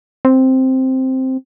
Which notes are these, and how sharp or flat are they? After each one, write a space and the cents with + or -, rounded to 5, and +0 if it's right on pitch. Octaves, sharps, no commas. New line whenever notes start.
C4 +0